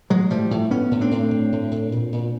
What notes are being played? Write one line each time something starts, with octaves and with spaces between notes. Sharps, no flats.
A2 F#3 G#3
A2 F3 G3
A2
A2 B3 C#4
A2
C4 D4
A2
A2
A2
A2
A#2
A#2